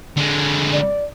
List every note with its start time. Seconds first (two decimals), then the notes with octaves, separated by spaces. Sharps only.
0.17 D3 G#3
0.73 D5